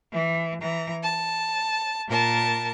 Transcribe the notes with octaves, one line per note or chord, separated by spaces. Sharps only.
E3
E3 A#5
A5
A#2 A#4 A5